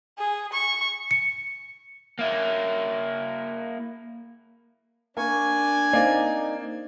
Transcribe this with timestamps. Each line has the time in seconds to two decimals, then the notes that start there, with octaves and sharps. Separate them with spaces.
0.18 G#4
0.53 C#6
1.11 C#7
2.19 A#3 E4
5.17 A#3 D4 G#5 C#6
5.93 A#3 C4 D#4 D5